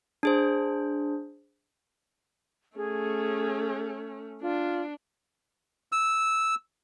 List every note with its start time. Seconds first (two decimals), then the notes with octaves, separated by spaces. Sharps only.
0.23 D4 G#4 C5
2.76 A3 C#4 G#4
4.42 D4 F4
5.92 E6